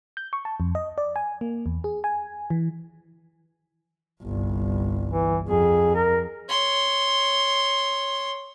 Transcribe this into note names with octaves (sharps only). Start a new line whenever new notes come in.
G6
C#6
A5
F2
D#5
D5
G#5
A#3
E2
G#4
G#5
E3
G1 C2
E3
F2 G#4
A#4
C#5 C6